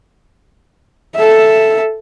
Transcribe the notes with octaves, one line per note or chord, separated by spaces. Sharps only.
A4 E5